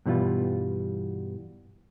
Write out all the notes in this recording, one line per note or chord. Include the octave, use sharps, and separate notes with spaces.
G2 B2 E3 G3 F4